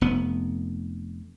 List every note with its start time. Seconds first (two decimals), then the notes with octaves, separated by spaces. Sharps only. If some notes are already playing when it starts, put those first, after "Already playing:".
0.01 F1 B3